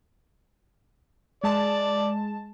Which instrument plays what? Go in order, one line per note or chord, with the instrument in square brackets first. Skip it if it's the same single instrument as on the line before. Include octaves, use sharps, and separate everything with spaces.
[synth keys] G#3 A5 [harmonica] D5